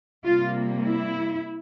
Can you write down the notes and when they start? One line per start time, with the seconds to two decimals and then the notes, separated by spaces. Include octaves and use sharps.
0.25 C3 G3 A#3 F4
0.85 E4